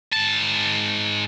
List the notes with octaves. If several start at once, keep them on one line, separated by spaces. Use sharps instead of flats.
G#2 A5